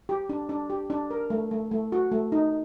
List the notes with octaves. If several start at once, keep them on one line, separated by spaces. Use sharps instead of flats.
G4
D4
D4
G4
D4
A#4
A3
A3
A3
F#4
A3
D#4